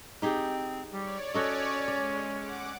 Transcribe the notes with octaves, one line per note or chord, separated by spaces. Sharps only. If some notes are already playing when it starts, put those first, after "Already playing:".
C4 D#4 G4 G#4
G3 C#5 D5
C#4 F#4 A4 D#5
G#3 D5
F#5 D6